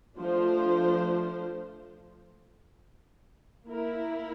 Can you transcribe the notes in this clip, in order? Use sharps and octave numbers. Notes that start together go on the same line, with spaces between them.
F3 A3 D4 F4 C5
A#3 E4 A#4